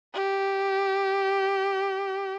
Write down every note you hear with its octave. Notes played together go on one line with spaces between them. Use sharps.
G4